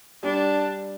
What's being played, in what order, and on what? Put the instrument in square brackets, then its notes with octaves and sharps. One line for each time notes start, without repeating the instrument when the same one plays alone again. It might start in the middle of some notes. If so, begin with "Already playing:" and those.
[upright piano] G3 [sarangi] D4